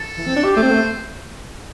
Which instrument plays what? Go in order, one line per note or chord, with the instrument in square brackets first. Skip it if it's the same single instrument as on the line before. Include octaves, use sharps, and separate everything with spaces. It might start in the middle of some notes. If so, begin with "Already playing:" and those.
Already playing: [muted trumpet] A4
[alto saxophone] E3
C4
D4
G4
[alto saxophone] A3 [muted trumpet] C5
[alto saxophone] C4
A3